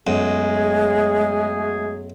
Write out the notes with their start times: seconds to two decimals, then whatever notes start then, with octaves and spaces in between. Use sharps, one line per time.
0.07 B1 F#2 F#3 G#3 A3 G#4